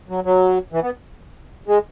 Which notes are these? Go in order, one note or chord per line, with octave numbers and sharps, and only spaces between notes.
F#3
F#3
E3
B3
G#3